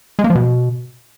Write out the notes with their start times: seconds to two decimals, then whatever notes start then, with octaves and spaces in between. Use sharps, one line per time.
0.19 G#3
0.24 A#3
0.30 F3
0.35 B2